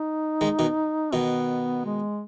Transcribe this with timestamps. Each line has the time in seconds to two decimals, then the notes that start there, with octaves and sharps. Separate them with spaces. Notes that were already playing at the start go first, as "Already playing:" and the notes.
Already playing: D#4
0.41 D#3 G#3
0.59 B2 D#3
1.13 B2 D#3 B3
1.85 G#3